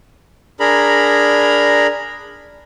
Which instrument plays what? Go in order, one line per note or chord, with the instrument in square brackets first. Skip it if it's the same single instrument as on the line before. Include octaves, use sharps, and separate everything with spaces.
[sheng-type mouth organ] D4 G#4 A#4 A#5 B5